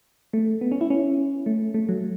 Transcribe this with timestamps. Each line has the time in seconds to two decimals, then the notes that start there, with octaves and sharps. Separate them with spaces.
0.33 A3
0.61 B3
0.72 C#4
0.81 E4
0.90 C#4
1.46 A3
1.74 A3
1.89 F#3